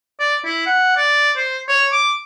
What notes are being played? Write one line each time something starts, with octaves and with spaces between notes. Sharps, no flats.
D5
E4
F#5
D5
C5
C#5
D6